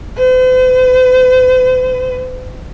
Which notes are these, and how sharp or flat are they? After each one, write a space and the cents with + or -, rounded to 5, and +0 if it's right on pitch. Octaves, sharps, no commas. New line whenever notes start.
C5 -45